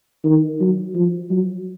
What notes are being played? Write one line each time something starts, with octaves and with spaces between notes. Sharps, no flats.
D#3
F#3
F3
F#3